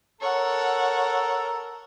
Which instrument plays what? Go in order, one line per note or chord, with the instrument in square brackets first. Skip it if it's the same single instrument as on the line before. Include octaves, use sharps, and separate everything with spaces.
[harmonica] A4 A#4 A#5 [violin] C#5 F#5